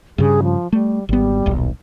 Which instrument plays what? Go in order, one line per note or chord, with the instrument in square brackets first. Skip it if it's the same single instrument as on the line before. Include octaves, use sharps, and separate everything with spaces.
[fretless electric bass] G2 C#3 [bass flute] G#4
[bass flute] F3
[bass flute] G3 [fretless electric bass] A3
[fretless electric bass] G#1 B3 [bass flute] G3
[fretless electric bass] D#1 B1